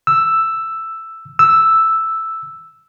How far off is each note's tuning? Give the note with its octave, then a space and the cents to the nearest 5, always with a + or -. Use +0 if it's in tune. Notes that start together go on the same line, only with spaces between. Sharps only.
E6 +5
E6 +0